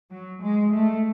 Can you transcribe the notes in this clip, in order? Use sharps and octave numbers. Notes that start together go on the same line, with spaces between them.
F#3
G#3
A3